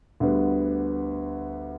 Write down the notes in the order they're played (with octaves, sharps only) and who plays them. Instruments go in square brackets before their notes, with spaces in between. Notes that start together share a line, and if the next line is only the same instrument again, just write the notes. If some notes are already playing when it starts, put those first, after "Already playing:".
[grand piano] D2 D3 G3 B3